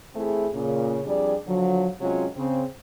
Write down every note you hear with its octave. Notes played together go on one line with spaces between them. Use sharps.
E3 A3 C4 E4 G#4
A#2 C#3
F2 G3 D4 G#4 D5
D3 F3 F#3
C3 F#3 G#3 C#4 F4
C#3 C4